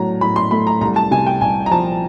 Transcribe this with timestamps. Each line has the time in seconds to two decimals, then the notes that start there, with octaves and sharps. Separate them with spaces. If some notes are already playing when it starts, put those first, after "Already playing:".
Already playing: A2 F#3 A#5
0.21 A2 B5
0.36 C6
0.51 A3 B5
0.67 A#5
0.81 C2 A#5
0.96 A5
1.11 C3 G#5
1.27 G5
1.41 C2 G#5
1.66 A#5
1.71 F3 A5